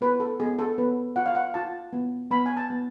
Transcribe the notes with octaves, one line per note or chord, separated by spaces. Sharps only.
B3 B4
A4
B3 G#4
A4
B3 B4
F4 F#5
F5
F#5
F4 A5
B3
B3 B5
G#5
A5
B3